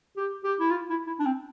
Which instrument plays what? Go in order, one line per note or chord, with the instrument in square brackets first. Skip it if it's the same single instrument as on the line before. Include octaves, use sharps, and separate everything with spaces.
[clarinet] G4
G4
E4
F4
E4
E4
D4
C4